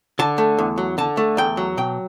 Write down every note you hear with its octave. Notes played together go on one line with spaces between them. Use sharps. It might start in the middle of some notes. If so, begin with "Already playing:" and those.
D3 A5
A3
E2
F#3
D3 A5
A3
E2 G5
F#3
B2 G5